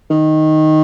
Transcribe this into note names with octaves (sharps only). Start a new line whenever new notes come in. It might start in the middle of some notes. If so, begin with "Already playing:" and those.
D#3